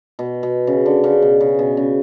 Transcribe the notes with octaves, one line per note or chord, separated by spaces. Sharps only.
B2
B2
C#3
D3
C#3
B2
C#3
B2
C#3